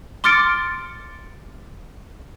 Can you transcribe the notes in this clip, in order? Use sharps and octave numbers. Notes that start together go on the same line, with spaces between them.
C6 D6 F6 A6 C#7 D7